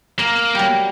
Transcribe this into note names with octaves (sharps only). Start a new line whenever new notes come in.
A#3 A#4
F#3 G3